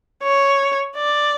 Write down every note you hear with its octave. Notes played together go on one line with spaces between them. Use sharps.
C#5
D5